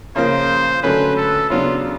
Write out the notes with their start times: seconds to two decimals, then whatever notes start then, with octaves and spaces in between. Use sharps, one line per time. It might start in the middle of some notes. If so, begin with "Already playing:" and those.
0.15 C#3 F3 A#3 C5
0.83 D3 F#3 A3 C#4 B4
1.17 A4
1.50 C#3 F#3 B3 D4 F4